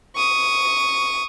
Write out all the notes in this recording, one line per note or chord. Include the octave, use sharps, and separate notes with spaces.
C#6 D#6